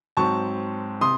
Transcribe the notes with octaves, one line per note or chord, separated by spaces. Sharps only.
G#2 F#3 C4 A5 C#6
C3 C6 D#6